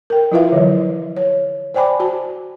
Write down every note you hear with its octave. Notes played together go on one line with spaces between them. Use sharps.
A#4 G5
F3 E4 F4 B4 E5 F5
D3 E3 F#3
C#5
C5 D5 G5 G#5 B5 D6
F#4 A5